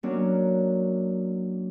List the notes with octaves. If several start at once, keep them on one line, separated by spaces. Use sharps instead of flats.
F#3 A#3 C#4 D4